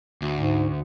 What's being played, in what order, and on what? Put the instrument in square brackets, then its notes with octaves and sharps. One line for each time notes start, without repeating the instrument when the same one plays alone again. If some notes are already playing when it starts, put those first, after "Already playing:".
[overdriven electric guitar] D2
[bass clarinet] G#2